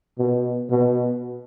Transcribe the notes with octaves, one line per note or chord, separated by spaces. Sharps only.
B2
B2